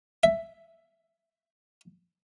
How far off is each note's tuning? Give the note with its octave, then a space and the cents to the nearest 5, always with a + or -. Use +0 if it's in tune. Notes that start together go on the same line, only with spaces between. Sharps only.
E5 +10